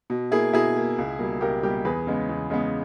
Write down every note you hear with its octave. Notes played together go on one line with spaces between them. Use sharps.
B2
A#3 E4 G#4
B2 E4 G#4
A#3
C#2
B2 G3 A#3
C#2 G4 A#4
B2 G3 A#3 G4 A#4
E2 G#4 B4
C#3 G#3 B3
E2
C#3 G#3 B3